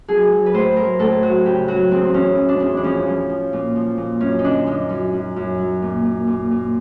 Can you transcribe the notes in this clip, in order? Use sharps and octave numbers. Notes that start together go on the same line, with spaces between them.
F#3 G#4
F#3
B4
A2 C5
F#3 A#4
A2 A4
F#3 F#4
C#3 G4
F#3 F#4
E2 C4
C4
E2 C#4
E2
D4
E2
D4
F3 C#4
F3
F3
A#2
F3
A#2
F#2 C#4
D#4
D3 D4
F#2 D#4
F#2
F#2
F#2
F#3
A#2
A#2
A#2
A#2